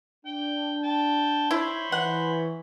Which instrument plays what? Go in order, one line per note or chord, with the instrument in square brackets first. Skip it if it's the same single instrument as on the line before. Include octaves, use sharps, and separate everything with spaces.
[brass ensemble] D4 [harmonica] G5
[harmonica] G5 A5
[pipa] E4 [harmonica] C5 C#5 B5
[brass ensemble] E3 [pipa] F#5